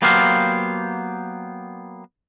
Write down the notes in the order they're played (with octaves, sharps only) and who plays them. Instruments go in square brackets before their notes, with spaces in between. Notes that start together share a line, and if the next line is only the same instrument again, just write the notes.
[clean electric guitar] F#3 A#3 B3 G4 C5 F5